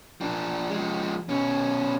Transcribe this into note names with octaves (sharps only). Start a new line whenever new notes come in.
F3 D4
F3 G#3
B2 C#4